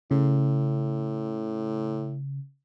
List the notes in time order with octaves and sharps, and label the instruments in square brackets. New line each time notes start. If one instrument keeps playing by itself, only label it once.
[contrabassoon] A2 [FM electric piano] C#3